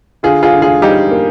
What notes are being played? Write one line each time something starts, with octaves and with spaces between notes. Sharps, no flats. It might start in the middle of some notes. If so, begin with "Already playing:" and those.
D3 F4 G#4
F4 G#4
D3
F4 G#4
G3 D#4 G4
A#3